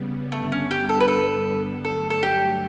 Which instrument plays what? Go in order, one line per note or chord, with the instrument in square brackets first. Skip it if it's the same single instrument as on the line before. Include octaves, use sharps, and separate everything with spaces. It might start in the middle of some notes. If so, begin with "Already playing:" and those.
Already playing: [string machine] C#3 G3 B3
[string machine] G2 D3 G3 B3 [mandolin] A3
[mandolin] C#4
G4
A4
B4
A4
[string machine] G2 D3 F#3 A3 [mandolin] A4
[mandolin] A4
G4